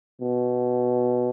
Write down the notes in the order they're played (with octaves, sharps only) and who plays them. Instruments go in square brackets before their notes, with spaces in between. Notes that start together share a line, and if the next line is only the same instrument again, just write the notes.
[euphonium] B2